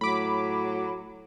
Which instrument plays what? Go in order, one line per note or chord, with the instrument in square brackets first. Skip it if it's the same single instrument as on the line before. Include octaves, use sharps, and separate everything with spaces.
[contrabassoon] A2 [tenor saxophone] F#3 [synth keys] B5 D6